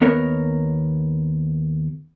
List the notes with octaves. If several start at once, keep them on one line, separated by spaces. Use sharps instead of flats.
D#2 B3 A#4 C#5